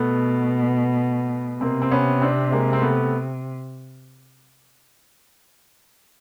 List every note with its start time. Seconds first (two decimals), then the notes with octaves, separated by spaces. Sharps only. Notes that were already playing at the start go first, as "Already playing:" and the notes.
Already playing: B2 A3 B3
1.61 C3 A#3 C4
1.82 C4
1.91 B3 C#4
2.22 C4 D4
2.52 G#3 A#3
2.73 C4
2.82 A3 B3